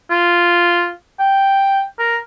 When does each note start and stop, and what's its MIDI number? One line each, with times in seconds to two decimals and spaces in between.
0.11 0.89 65
1.20 1.83 79
1.99 2.17 70